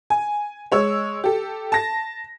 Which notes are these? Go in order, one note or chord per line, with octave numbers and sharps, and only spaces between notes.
G#5
G#3 C#5 E6
G4 A4
A5 A#6